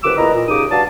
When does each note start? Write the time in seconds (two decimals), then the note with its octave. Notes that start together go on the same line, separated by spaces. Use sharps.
0.03 C2 F#2 C#3 B4 D6 E6
0.18 E2 A#2 E4 D#5 A#5
0.34 A#2
0.48 F#2 C#3 D#4 G4 D6 D#6
0.71 G2 F#4 D5 F5 A5